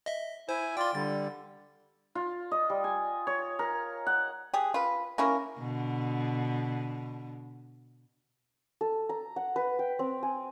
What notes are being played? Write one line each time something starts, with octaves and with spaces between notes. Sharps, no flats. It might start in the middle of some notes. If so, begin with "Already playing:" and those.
D#5 E5
E4 C5 G#5
F4 D5 G5 C6
D3 G3 A6
F4
D#5
G3
G#5
C#5
A#4
F#5
G4 G#4
F4 B4
A#3 C#4 E4 A#4
B2 D3
A4
A#5
F#5
B4
G5
C4
G#5